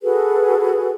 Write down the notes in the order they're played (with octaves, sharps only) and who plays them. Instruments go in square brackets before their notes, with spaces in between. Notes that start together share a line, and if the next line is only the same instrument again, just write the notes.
[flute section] F#4 G#4 A4 B4